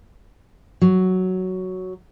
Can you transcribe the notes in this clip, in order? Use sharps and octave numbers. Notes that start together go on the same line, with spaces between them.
F#3